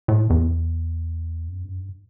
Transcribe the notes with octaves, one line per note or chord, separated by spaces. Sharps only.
A2
E2
F#2
F2
G2
F#2
G2